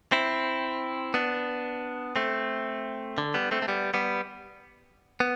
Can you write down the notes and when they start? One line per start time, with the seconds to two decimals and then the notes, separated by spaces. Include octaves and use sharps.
0.12 C4 E4
1.14 B3 D4
2.16 A3 C4
3.18 D3
3.34 G3 B3
3.51 A3 C4
3.62 A3
3.68 G3 B3
3.94 G3 B3
5.20 B3